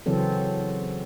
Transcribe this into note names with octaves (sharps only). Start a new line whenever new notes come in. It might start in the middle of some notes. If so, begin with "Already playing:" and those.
C#3 E3 F#3 C4 A4